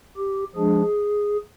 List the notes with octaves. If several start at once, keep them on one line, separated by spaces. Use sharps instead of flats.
G4
F3 G#3 D4 G#4